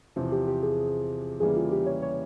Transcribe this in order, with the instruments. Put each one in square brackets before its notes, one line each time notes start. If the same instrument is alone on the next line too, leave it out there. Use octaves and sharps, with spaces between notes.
[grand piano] E2 C3 F3
[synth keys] G4
G4
G#4
[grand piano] E2 C#3 E3 G3 A#3 [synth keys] G#4
[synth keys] F4
G4
C#5
C#5